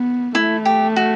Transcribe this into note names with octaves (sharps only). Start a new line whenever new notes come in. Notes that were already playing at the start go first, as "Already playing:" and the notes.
Already playing: B3
A3 E4
G4
F#4